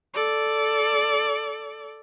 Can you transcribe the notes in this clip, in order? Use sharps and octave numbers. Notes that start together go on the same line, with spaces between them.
A4 D5